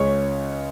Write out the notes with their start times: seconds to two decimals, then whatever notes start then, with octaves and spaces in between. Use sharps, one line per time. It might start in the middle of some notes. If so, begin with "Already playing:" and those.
Already playing: C#2 C#3 G#3 C#4 C#5